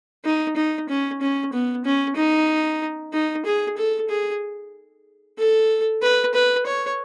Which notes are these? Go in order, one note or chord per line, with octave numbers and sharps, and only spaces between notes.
D#4
D#4
C#4
C#4
B3
C#4
D#4
D#4
G#4
A4
G#4
A4
B4
B4
C#5